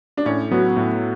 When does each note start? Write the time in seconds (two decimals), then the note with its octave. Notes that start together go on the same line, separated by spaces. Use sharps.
0.17 D4
0.26 A2 C#4
0.51 F#3 B3 F#4
0.77 A2